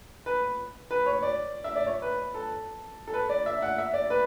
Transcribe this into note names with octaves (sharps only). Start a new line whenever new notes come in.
B4
B4
C#5
D5
E5
D5
C#5
B4
A4
A4
B4
D5
E5
F#5
E5
D5
B4